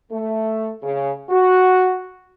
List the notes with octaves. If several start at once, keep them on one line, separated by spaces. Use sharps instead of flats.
A3
C#3
F#4